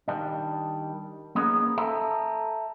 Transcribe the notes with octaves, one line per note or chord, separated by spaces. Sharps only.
D#3 G3 D4
A#3 B3 C#4 D#4 G#4 A#4
A4 E5 A#5